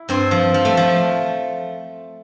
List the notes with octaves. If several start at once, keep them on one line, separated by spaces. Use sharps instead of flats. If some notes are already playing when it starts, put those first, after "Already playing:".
Already playing: E4
G2 C4
F3
F3
A3
F3